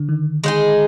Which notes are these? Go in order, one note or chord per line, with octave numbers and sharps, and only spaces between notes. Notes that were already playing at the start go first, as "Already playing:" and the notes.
Already playing: D3
D#3
G#3 D#4 G#4